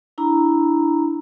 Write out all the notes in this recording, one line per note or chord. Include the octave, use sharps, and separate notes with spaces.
D4 E4 A#5 B5